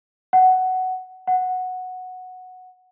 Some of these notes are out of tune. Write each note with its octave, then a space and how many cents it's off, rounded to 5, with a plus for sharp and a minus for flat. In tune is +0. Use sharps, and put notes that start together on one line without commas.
F#5 +10
F#5 -5